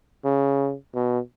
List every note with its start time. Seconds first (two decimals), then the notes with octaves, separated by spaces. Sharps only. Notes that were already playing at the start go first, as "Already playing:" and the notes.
0.24 C#3
0.94 B2